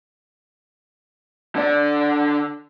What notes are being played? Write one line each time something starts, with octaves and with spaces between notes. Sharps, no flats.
D3 D5